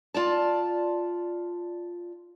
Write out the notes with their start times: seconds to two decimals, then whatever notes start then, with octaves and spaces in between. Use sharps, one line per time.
0.14 F4 D5 A5